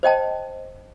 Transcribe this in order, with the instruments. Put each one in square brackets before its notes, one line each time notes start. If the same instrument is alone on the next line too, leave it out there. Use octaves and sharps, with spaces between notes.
[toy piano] C5 D#5 G5 A5